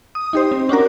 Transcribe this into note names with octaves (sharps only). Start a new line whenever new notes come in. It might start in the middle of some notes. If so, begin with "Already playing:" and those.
D#6
D#4 G4 C5
C4
C#4 D4 F#4 A#4